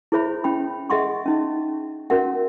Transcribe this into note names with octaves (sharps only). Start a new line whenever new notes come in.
E4 G#4 C5 C#5 E5 B5
C#4 C#5 G5 B5
G#4 D#5 E5 F#5 C6 C#6
C#4 D#4 D#5
C#4 F#4 A#4 E5 F#5